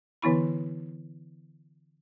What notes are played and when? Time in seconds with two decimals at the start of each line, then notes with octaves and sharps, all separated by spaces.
0.22 D3 E3 B3 E4 B5